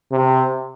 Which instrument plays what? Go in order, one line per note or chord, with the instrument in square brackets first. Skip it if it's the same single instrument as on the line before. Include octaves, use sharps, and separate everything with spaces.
[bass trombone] C3